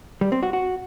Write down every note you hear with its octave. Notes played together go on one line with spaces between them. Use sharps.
G3
C4
F#4
F#4